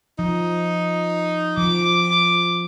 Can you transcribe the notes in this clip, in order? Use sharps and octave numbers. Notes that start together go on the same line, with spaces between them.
F3 D#4
F3 D6